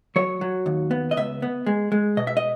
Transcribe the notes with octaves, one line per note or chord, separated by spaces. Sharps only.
F#3 C#5
F#3
D#2
B3
D#5
C#2 E5
B3
G#3
G#3
B2 D#5
E5
D#5